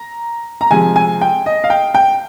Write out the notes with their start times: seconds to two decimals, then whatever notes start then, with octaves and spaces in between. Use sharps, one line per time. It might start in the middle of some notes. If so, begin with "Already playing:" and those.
Already playing: A#5
0.61 A#5
0.71 C3 F3 G#3 G#5
0.96 G#5
1.21 G5
1.46 D#5
1.64 F5
1.70 G5
1.95 G5